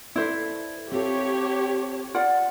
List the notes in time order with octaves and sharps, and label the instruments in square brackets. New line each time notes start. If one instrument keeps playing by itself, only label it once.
[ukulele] E4 C5 E5 [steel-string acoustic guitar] A4 B4 D5
[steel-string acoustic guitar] C4 F4 A4 [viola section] G4 C#5
[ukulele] F4 D5 F#5